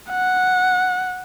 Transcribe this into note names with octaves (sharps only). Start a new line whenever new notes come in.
F#5